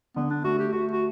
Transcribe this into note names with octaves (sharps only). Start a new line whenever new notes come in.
D3 B3
D4
A3 F#4
G4
A3 F#4
F#4